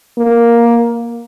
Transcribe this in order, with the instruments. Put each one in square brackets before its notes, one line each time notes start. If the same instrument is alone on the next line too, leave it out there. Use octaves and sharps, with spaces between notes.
[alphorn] A#3